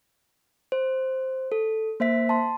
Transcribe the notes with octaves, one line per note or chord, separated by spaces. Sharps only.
C5
A4
A#3 C5 E5 B6
A5 C6